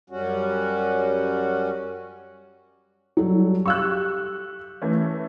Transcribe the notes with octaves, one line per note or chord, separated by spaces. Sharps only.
F#2 G3 C#4 F#4
F#3 G3 A4
G4 F5 C#6 E6 F#6
E3 A3 C#4